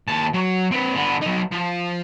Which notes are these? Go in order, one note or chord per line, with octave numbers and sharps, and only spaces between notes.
D#2 A5
F#3
C4 B4
D3 B3
F#3 D#4
F3